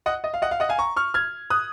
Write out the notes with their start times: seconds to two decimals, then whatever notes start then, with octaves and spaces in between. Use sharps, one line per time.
0.06 D#5 F#5
0.24 D#5
0.34 F5
0.42 D#5 F#5
0.51 F5
0.60 D#5 F#5
0.69 F5 G#5
0.78 A#5 C#6
0.96 C#6 F6
1.14 F6 G#6
1.50 D#6 F#6